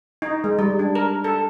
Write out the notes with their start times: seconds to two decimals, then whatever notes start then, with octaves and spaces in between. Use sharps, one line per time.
0.22 D#4
0.44 G#3
0.59 G3
0.79 D4
0.95 A#4
1.24 A4